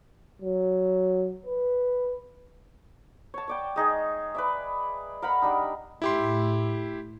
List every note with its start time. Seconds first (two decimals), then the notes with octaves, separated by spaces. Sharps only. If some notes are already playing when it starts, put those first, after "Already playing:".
0.42 F#3
1.46 B4
3.34 C#5 A5
3.48 C#5 D5 G5
3.76 G#3 D#4 G#4
4.35 B4 D5 E5
5.22 A#4 F5 F#5 B5
5.42 G3 D4 D#4
6.02 A2 E4 G4 C6